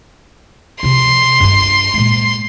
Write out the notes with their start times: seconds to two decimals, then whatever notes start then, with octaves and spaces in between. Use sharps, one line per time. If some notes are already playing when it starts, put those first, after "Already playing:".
0.83 C3 F3 C6
1.40 G2 F4
1.94 A#2 G#3